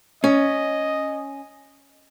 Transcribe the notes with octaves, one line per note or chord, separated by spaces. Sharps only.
C#4 D#5